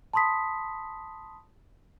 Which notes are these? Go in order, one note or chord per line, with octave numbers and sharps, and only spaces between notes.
A5 B5 C6 D#6 B6